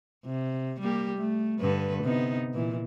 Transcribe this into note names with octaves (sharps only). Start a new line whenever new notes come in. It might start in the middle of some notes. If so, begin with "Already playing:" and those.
C3
G3 A#3 G4
A3
G2 D3 B4
C3 B3 D#4
A#2 E3